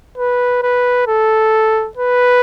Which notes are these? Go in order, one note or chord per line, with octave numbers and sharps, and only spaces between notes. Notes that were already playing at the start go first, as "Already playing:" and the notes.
B4
B4
A4
B4